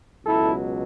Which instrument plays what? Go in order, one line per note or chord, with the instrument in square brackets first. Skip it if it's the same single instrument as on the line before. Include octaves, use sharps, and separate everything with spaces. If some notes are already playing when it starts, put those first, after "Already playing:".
[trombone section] C#2 B2 F#3 E4 A4